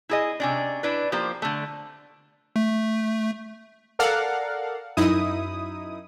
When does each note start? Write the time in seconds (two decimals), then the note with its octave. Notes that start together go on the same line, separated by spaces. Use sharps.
0.09 E4 G#4 D#5
0.40 C3 C#4 D4
0.83 D4 E4 B4
1.12 F3 A#3 G4 C5
1.42 D3 A3
2.56 A3
3.99 A4 A#4 D5 F5 F#5
4.97 F#2 D#4 E4 D#6